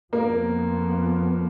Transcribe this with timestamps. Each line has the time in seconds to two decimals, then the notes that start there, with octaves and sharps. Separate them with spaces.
0.12 F2 F3 A#3 B3 A#4